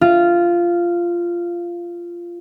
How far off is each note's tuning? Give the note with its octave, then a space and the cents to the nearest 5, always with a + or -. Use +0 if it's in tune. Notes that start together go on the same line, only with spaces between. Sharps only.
F4 -10